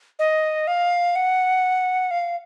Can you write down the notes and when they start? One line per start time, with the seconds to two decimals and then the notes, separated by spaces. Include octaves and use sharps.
0.19 D#5
0.67 F5
1.16 F#5
2.11 F5